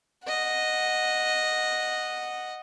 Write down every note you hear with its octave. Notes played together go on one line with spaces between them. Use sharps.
D#5 F#5